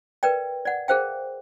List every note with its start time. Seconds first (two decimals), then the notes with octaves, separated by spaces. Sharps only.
0.23 A#4 B4 D5 G5
0.65 D5 F#5
0.88 G#4 A#4 C5 F5 G5